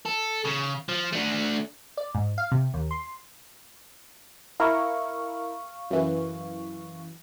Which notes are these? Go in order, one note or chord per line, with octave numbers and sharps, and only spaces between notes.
A4
C#3
F3
A3 D4
D5
G#2
F5
C3
D#2
C6
E4 A#4 F5 C#6
F#2 E3